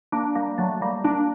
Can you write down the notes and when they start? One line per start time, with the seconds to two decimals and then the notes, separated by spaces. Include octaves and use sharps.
0.12 A#3 D4
0.35 G3 A#3
0.58 F#3 A3
0.81 G3 A#3
1.04 A#3 D4